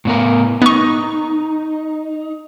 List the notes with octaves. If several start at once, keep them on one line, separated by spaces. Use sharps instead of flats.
A2 B3 A#4
B3 D#4 C#6